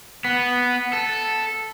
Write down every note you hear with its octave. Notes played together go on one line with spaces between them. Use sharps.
B3
A4